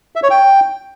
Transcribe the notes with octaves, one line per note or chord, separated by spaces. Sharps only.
E5
C#5
G5